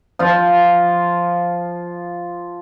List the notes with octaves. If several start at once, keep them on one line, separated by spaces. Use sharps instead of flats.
F3 F4